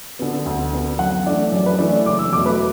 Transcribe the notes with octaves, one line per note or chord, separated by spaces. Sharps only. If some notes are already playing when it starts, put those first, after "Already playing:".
D3 B3
D2
D3 B3
F#2 F#5
E3 A3 D4 D5
F#2 D5
B4
E3 A3 D4 D5
D5
F#1 D6
E6
E2 B2 F#3 A3 D6
B4